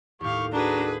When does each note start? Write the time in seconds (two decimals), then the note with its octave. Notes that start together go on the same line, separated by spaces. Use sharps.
0.21 D#2 A2 G4 F5 C#6
0.52 D4 F#4 G#4 B4 A#5